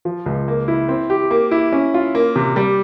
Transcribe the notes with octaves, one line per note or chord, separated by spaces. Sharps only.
F3
C#2
A#3
E4
C4
G4
A#3
E4
C#4
F4
A#3
C3
G3